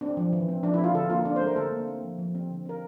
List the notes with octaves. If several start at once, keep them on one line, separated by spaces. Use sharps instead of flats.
C4 D4
F3
E3
C4
F3 D4
E4
C4
F4
D3 A4
A#3 F4
C4 D4
C5
A3 A#4
D3 A4
A#3
C4
F3
F3
C4
D3
C4 A#4